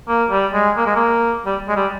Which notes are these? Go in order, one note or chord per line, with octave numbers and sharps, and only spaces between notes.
A#3
G3
G#3
A#3
G#3
A#3
G3
G#3
G3